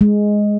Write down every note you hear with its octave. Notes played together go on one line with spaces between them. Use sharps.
G#3